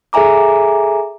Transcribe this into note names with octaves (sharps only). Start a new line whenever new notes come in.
G#4 A4 E5 G#5 A#5 D6